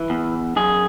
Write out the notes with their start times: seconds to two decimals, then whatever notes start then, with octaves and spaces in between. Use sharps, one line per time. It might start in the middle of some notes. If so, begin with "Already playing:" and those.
Already playing: E3 E4
0.10 E2
0.56 F#2 G#4